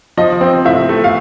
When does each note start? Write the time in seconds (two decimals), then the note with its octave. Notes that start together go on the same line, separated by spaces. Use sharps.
0.17 F3 D#5
0.41 C4
0.65 A2 E5
0.89 A3
1.04 F5